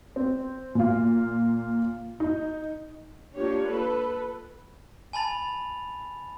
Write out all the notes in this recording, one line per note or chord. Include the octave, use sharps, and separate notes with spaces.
C4
A#2 F4
D#4
A#3 D4 F4 G4 C#5
A4 B4
G#5 A5 B5 A6 F7